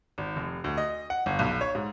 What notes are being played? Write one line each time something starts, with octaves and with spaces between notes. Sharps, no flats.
G#1
F1
D2
D#5
F#5
G1
B1
C#5
G#2